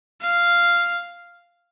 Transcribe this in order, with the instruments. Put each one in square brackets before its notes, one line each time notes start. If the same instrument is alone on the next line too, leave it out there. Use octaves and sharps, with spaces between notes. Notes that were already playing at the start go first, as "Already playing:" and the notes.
[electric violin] F5